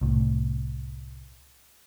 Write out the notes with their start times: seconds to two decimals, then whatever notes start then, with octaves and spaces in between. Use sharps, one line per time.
0.01 C2 A2